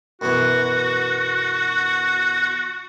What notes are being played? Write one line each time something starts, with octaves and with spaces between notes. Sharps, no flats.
F#2 B2 E3 F#4